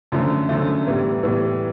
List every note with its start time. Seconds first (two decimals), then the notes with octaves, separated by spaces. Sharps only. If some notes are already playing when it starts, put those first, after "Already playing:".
0.12 F#2 D3 F3 A3
0.49 F#2 D3 F3 A3
0.86 A2 E3 G3 B3
1.23 A2 E3 G3 B3